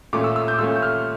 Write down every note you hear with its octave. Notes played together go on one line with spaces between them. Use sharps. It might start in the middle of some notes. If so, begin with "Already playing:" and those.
A#2 A3 C#4 D6
E6
E6
G6
D6
A#2 A3 C#4 E6
G6
F6